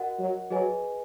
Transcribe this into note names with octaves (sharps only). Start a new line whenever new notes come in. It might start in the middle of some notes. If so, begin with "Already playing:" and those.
Already playing: F#4 A#4 D#5 F#5
F#3
F#3 G#4 B4 D#5 G#5